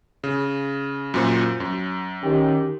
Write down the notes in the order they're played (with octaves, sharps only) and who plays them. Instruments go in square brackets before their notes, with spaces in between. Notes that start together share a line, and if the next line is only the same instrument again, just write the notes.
[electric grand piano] C#3
F#2 A#2 C5
F#2
[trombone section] D#3 C#4 G4